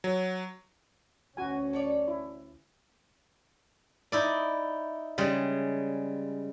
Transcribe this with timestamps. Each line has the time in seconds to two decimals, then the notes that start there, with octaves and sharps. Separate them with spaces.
0.04 F#3
1.37 D2 C#4 F#4 G#5
1.73 A4 C#5 D5
2.08 E4
4.12 D#4 E4 D5
5.18 C#3 G3 G#3